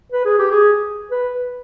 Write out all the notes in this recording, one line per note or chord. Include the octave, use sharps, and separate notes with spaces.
B4
G#4
G4
G#4
B4